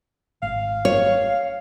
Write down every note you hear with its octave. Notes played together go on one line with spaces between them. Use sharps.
G#1 F5
C#5